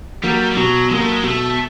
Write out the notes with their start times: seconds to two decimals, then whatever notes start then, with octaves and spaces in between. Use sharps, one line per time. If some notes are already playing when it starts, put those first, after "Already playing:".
0.23 F#3 G3 A#3
0.51 G3
0.56 B2 F#3
0.90 F#3 G#3 A#3
1.01 A3
1.12 G#3
1.23 B2 A3